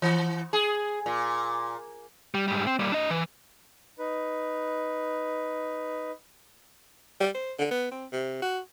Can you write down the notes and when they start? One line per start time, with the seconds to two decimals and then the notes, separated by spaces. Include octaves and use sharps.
0.02 E3
0.53 G#4
1.06 A#2
2.34 G3
2.48 G#2 G3
2.67 C4
2.79 G3 A#3
2.92 D4 D#5
3.11 E3
3.99 D#4 B4
7.21 G3
7.35 C5
7.59 D3
7.71 B3
7.91 C4
8.13 C3
8.42 F#4